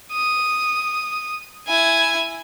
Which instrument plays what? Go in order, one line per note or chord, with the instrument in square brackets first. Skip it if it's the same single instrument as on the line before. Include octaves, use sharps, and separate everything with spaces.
[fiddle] D#6
E4 G#5